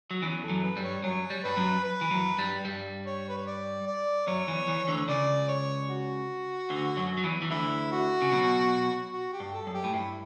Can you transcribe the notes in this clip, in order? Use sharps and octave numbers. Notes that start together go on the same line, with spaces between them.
F#3
E2 E3 C#4
A4
F#2 F#3
B4
G2 G3
C#5
F#2 F#3 C#5
G3
G2 G3 B4
F#2 F#3
B4
E3
F#2 F#3
G2 G3
G2 G3
C#5
B4
C#5
D5
D5
F#2 F#3 C#5
E2 E3
E2 E3
D2 D3
C#2 C#3 D5
C#5
F#4
D2 D3
F#2 F#3
F#3
E2 E3
E3
D2 D3 E4
F#4
C#3
B1 B2
F#4
G4
G2
A4
F#2
G4
A2
G2 E4